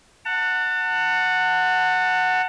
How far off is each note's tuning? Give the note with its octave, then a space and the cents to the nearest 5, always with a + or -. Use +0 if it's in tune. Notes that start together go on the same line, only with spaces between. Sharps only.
F#5 +0 A5 +35